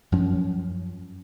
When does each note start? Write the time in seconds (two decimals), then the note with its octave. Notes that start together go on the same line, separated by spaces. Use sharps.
0.12 F#2 F3 C#4